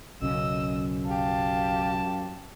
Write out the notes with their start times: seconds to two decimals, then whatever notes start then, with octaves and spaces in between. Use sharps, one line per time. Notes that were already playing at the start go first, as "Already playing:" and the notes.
0.22 B1 F#2 C#3 C#4 D#5 E6
1.06 G4 F5 A5